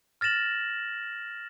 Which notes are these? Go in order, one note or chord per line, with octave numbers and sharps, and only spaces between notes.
F6 A6 A#6 E7 F#7